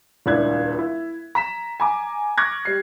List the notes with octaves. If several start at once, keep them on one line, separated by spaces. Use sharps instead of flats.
D#1 C#2 D4 E4 F#6 G#6
E4
A#5 B6 E7
G#5 A#5 D6
C#6 D6 F6 F#6 G#6 A#6
G3 C7